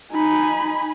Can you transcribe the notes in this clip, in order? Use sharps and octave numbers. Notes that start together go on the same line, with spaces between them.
D#4 G#5 B5